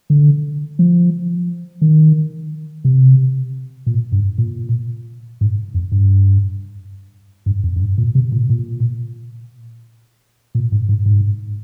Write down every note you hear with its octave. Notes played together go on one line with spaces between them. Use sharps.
D3
F3
D#3
C3
A#2
G2
A#2
G#2
F2
G2
G2
F2
F2
G2
A#2
C3
A#2
A#2
A#2
G#2
G#2
G#2